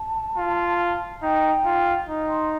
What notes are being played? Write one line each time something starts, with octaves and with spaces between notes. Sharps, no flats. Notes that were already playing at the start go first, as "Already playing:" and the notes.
Already playing: A5
F4
D#4 G5
F4
D#4
C6